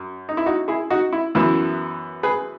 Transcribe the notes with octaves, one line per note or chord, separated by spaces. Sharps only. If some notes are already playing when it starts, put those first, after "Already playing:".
Already playing: F#2
D#4
E4
D#4 F#4
E4 G#4
D#4 F#4
E4
F#2 E3 B3 E4
G#4 B4